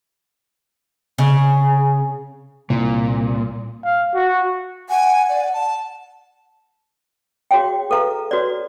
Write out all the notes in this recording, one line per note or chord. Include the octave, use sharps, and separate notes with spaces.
C#3
C2 A#2
F5
F#4
F#5 G#5
D5
A5
F#4 G#4 C#5 F5 G5
G#4 A4 B4 F5 A#5
F#4 B4 C#5 D5